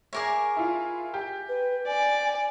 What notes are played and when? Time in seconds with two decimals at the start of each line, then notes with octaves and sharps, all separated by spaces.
0.13 G#4 A#4 C#5 E5 D6
0.57 E4 F4
1.14 G4
1.48 B4
1.87 D5 G#5